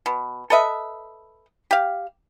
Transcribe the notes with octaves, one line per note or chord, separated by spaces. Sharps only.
B2
A4 B4 D#5 E5
G4 F5